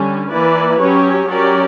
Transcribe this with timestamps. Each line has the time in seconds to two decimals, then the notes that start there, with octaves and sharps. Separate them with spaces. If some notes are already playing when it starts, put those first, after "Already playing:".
Already playing: D3 G3 C#4
0.31 E3 A#3 E4 B4 D5
0.80 F#3 C#4 G4 C#5
1.30 F#3 C#4 G4 A#4 D5